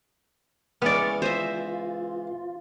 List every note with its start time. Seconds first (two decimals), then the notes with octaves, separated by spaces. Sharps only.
0.82 C#2 E3 G#3 B3 D5 C#6 F6
1.22 F4 C5 D#5 E5